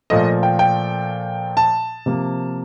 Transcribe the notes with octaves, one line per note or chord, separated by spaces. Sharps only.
A#2 F3 A3 D#5
G5
G5
A5
C3 F3 A#3